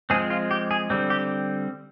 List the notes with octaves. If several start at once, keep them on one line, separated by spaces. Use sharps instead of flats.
F3 G#3 C4 G#4
F4
G4
G#4
D3 G3 C4
G4